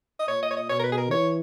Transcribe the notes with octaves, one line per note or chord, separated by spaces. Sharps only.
D#5
A#2 C#5
D#5
C#5
D#5
B2 C#5
A#4
B4
G#4
A#4
E3 C#5